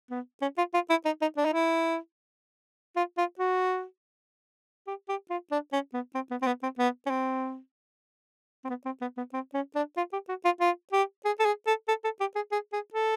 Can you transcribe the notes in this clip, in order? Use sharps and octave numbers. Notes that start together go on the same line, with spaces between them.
B3
C#4
F4
F4
E4
D#4
D#4
D4
D#4
E4
F4
F4
F#4
G4
G4
F4
D4
C#4
B3
C4
B3
C4
B3
C4
B3
C#4
C4
C4
B3
C4
B3
B3
C4
C#4
D4
F4
G4
F#4
F4
F4
G4
G#4
A4
G#4
A4
A4
A4
G4
G#4
G#4
G#4
A4